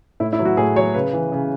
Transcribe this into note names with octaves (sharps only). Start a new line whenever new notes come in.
A2 E4
E4
F#3
F#4
A2 G#4
F#3 C#5
C#3 B4
E3
C#3